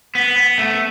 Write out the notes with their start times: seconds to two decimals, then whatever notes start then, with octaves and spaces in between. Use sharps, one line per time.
0.15 B3
0.37 B3
0.58 A3